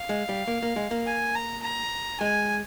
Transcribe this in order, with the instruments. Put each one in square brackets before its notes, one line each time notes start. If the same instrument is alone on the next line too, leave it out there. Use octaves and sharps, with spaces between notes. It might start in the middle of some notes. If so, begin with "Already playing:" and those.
Already playing: [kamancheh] F5
[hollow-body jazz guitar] G#3
G3
A#3
A#3
G#3
A#3
[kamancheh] G#5
A#5
A#5
[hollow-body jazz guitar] G#3 [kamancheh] G#5